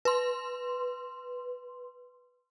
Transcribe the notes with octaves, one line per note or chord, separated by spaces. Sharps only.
B4 C6